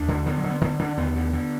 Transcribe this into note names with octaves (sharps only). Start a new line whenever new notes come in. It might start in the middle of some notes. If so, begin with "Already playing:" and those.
Already playing: D#2 D4
D3
D3 B3
F#3
D3
B3
D3 B3
D3 D4
D#2 B3
D3
D3